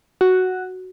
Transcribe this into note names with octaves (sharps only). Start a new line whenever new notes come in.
F#4